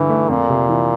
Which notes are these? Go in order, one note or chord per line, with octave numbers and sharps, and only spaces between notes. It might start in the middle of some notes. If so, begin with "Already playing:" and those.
Already playing: G2 D3 E3
A3
F2 A#2
C3
E3